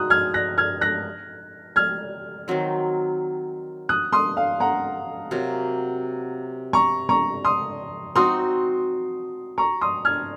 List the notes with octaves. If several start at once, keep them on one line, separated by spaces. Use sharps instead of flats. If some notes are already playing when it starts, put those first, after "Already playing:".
Already playing: G#3 D#4 F#4 D#6 F#6
F6 G#6
F#6 A#6
F6 G#6
F#6 A#6
F6 G#6
D#3 F#3 C4
D#6 F#6
C6 D#6
F5
F#5 A#5
C3 F#3 A#3
A#5 C#6
A#5 C#6
C6 D#6
C4 D#4 F#4 C6 D#6
A#5 C#6
C6 D#6
F6 G#6